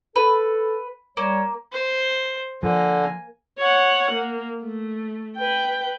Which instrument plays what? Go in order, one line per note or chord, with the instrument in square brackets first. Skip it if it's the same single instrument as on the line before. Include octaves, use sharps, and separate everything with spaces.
[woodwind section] A4 [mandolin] B4
[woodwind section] G3 C#5 [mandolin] A#3
[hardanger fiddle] C5
[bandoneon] D3 [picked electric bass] F3 [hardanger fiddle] A#3 G#5
[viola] C#5 F#5
A#3
A3
B4 G5